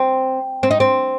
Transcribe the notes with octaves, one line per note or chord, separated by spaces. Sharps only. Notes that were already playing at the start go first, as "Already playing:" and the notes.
Already playing: C4 G5
C4
D#4
C4